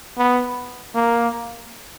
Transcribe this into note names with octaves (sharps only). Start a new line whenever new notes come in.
B3
A#3